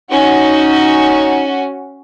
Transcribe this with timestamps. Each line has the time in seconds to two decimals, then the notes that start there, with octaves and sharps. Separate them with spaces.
0.12 C#4 D#4 F#4